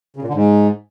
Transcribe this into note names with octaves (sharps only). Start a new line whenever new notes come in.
C#3
A#2
D3
G#2